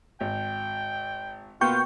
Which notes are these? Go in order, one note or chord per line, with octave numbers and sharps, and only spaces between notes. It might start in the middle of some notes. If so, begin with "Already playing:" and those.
G#1 G5
B2 A#3 B3 F4 G5 C#6 G6